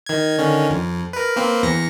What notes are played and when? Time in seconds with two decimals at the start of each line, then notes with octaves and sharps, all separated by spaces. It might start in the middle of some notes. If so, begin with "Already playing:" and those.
0.06 D#3 G#6
0.39 D3 D#3 C#4
0.70 F2
1.13 A#4 B4
1.36 A#3 C4 B4
1.63 E2 A#6 C#7